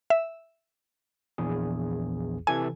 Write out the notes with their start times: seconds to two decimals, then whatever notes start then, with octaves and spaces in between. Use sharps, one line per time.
0.10 E5
1.38 A#1 E2 G#4
2.47 C3 E3 A4 G#5